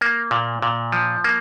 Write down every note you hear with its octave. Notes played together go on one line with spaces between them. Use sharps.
A#3
A#2
A#2
F3
A#3